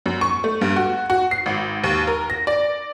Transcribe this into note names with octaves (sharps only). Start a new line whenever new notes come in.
F#2
C#6
A3
G2
F#4
F#4
C7
G#1
D#2
A#4
A#6
D5